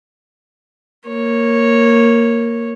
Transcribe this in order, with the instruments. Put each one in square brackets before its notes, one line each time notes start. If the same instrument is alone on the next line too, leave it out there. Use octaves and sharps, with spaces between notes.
[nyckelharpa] A#3 C#5